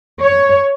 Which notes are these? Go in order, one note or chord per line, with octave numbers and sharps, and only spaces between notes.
C#5